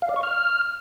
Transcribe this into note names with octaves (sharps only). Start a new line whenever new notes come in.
F5
D5
C#6
F6